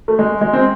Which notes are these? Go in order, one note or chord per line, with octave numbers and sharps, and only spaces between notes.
A3
G#3
G#3
C4